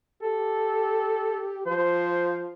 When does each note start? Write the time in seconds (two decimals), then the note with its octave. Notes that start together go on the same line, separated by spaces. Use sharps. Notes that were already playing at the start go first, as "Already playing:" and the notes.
0.22 G4 A4
1.66 F3 C5